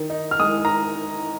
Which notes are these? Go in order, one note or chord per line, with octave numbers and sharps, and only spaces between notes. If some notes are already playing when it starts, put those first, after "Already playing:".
Already playing: D#3
D#4
F6
G#3 D#6
A#5